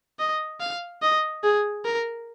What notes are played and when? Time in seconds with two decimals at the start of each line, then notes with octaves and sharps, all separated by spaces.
0.19 D#5
0.60 F5
1.02 D#5
1.43 G#4
1.85 A#4